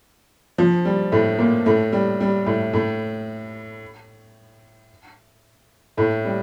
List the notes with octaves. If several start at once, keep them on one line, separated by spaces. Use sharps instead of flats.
F3
G3
A2 A3
A#2 A#3
A2 A3
G3
G3
A2 A3
A2 A3
A2 A3
G3